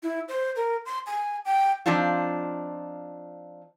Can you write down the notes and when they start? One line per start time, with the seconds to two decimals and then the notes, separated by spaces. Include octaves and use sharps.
0.03 E4
0.28 C5
0.56 A#4
0.86 C6
1.06 G#5
1.45 G5
1.86 F3 C4 D4 D#4 F4